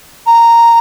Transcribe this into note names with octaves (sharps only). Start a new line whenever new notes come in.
A#5